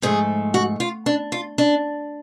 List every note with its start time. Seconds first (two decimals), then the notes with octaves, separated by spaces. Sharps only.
0.02 G#2 F3 A3 G#4
0.54 F#4
0.80 F4
1.06 D4
1.32 F4
1.58 D4